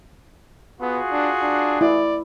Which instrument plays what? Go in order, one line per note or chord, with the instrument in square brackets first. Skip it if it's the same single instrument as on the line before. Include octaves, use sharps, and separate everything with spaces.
[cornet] B3 [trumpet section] F4 F#4 G#4
[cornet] D4
D4
[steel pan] E4 [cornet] D5